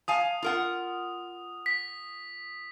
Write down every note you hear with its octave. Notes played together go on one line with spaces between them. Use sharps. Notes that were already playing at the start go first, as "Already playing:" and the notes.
F5 G#5 A5 D#6
F4 A#4 F#5
B6